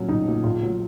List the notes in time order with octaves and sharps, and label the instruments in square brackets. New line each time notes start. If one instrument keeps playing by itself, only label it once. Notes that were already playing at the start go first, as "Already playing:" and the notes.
Already playing: [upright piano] A#2 F#3 C#4
B1 D#4
A#2 F#3
A#1 F4
A#2 F#3